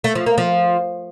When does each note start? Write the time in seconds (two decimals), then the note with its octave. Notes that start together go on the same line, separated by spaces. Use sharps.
0.04 A3
0.15 F3
0.26 A#3
0.38 F3